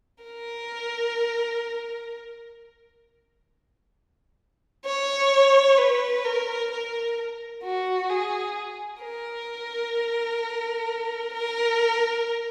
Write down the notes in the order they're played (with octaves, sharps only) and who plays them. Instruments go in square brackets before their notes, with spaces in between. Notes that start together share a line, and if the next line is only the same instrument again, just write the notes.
[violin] A#4
C#5
B4
A#4
A#4
F#4
G#4
A#4
A#4